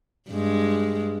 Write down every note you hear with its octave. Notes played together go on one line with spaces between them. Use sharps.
G2 G#3